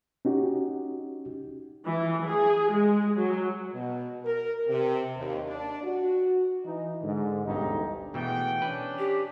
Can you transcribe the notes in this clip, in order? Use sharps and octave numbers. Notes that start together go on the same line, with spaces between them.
C#4 D#4 F#4 G4
E3
G#4
G#3
F#3
B2
A#4
C3
D#2
D4
F#4
E3 D#4
G#2 D3
A1 D2 G2 B2 D#4
B2 E3 A3 G#4 F#5 G5
C#4 D4 B4
G4